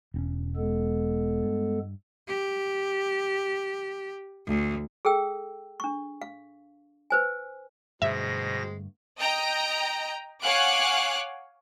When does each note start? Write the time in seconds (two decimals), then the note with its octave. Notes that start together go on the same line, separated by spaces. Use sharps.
0.14 E1 C4 C#4
0.56 G#3 B3 A4
1.42 G2
2.28 G4
4.47 D2
5.05 G#4 A4 G5 E6
5.80 D4 C#6
6.22 F5
7.10 B4 C5 G#5
8.02 G2 B2 D3 G#3 A3 C4 E5 A#6
9.20 D#5 G5 A#5
10.42 C#5 F5 F#5 G#5 D6 F#6